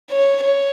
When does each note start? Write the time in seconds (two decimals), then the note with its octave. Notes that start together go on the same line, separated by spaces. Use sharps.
0.10 C#5
0.42 C#5